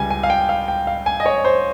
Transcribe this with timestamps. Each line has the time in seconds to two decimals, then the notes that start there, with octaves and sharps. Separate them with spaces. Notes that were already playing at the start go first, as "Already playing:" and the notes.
Already playing: C#2 C#3 G3 G#5
0.10 G#5
0.23 F5
0.30 G5
0.49 F5
0.68 G5
0.87 F5
1.06 G#5
1.20 D#5
1.26 C#5
1.45 C5